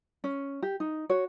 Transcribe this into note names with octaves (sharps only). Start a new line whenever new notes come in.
C#4
G4
D#4
F#4 C#5